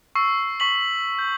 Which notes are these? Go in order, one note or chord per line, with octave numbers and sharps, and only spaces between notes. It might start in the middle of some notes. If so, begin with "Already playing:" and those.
C#6 E6 C7
C#6 B6 F#7
G6